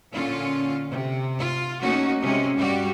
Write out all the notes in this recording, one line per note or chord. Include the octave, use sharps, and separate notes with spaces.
A#2 D3 C#4 F4
C3
F4
A3 A#3 C#4 D#4 F#4
C3 G#3 C#4
G2 G3 F#4 G4